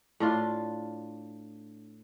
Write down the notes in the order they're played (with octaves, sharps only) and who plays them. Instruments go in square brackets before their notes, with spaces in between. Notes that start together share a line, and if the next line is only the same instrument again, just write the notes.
[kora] A2 D4 F4